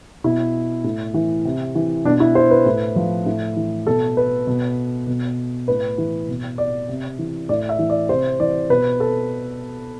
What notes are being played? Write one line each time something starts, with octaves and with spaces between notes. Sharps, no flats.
B2 E4
A2
E3
C3
E3
B2 D4
E4
C5
B4
A2
F3
A2
E3
B2 A4
B4
B2
B2
A2 B4
E3
B2
D5
C3
E3
A2 D5
E5
E3
D5
C3 C5
E3 D5
B2 B4
A4